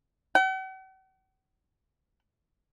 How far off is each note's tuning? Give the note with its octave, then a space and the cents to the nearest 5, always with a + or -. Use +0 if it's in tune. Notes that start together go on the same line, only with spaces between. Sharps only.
F#5 +45